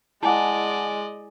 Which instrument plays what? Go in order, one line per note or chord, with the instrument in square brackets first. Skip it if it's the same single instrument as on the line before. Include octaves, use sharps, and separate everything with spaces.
[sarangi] G#3 [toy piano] E4 G#5 D6 [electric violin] D5 D#5 [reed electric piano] F#5 A5